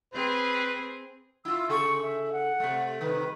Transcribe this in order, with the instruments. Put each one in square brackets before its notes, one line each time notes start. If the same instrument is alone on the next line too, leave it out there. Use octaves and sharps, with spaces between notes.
[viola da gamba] C4 G#4 C5 [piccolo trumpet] B4
[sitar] E4 F4 [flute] E6
[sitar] C#3 G#4 A4 [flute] C#6
[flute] E5
F#5
[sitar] C3 A3
[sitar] G2 C3 D#3 [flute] B4